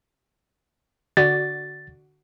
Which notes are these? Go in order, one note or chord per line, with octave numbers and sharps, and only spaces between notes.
D3 F#4 D5 A6